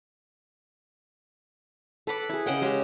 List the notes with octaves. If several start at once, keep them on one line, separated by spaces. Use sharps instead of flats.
A4 B4 B5 D6
E4 G#4
C#3 D#5 F#5 G5
G#3 G4